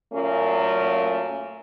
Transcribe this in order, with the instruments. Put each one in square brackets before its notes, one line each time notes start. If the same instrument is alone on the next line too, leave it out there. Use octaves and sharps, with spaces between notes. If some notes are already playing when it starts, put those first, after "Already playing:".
[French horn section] F#2 A#2 F#3 A3 A#3 C#4